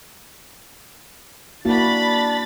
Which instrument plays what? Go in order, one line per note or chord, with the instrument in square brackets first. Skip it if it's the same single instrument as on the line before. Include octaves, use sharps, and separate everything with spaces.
[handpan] A#3 E4 F#4 [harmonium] D4 [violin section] B5 A6